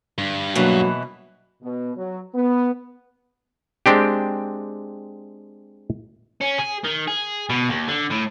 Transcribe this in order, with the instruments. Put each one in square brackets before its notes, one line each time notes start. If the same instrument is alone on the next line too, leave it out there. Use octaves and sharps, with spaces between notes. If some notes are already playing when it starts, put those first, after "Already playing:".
[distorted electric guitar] G2 [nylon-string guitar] D3
[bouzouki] B2 E3 [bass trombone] F#3 [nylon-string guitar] A#3 D4 F#4
[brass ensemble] B2
F#3
B3
[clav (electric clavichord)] G#3 C4 D4 G4
[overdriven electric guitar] C#4
G#4
D#3
G#4
B2
D#2
D3
A2